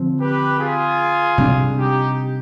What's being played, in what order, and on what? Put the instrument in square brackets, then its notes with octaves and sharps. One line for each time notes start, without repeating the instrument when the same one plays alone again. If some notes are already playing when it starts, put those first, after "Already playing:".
Already playing: [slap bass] D3 F3 C4
[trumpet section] G4 B4
F4 G#4
[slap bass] C3 G3 D4
[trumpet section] D#4 G4